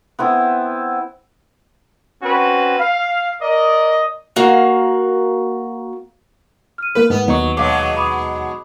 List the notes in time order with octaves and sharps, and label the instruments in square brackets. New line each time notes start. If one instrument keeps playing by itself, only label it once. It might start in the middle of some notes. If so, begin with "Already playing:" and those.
[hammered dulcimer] B3 C4 E4 A5
[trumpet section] C4 C#4 F#4 B4
F5
A#4 D5 D#5
[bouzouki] A#3 F#4 F5
[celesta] F6 D#7
[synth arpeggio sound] A#3 A#4 B6 [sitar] B4
[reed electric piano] G#2 [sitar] B3 [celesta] B4
[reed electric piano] D#2 D#4 C#6 [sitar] F#3 [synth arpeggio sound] B3
[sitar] B2 F#3 G#3 [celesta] C#5 F5 D6
[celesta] B5 D6 D#6